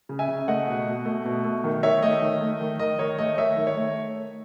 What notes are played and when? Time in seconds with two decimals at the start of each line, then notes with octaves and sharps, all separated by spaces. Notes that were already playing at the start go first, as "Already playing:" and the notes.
0.09 C#3
0.19 E5 G#5
0.28 C#3
0.48 A3 D#5 F#5
0.68 B2
0.87 B2
1.06 A3
1.25 B2
1.44 A3
1.64 D#3
1.83 D#3 C#5 E5
2.03 A3 D#5
2.22 D#3
2.41 A3
2.61 D#3
2.79 D#3 D#5
2.99 D#3 C#5
3.18 A3 D#5
3.38 D#3 C#5 E5
3.57 D#3
3.67 C#5
3.77 A3